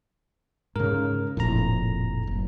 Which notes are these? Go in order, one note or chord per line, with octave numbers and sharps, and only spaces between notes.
G#2 C#3 A#4
F1 A#1 F2 A2 A#5
F#1